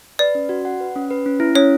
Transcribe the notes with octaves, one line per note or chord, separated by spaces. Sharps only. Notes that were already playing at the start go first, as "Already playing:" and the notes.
B4 D5
C#4
F#4
F#5
B4
C#4
B4
C#4
E4
C#4 C#5